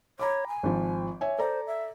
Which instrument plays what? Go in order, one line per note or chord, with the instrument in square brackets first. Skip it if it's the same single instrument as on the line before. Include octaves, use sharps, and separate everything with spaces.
[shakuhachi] C#5 [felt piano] A#5 B5 D6
[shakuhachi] G#5
[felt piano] G#1 F3
C#5 E5 G#5
[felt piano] A4 D5 A#5 [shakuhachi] C5
[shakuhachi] E5